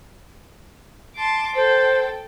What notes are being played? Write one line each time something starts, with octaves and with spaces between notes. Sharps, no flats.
A5 C6 D6
A4 C5 G5